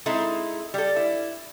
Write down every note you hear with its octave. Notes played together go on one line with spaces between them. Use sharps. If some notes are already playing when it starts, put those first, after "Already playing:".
G#3 C4 D#4 E4 A4
G3 A4
E4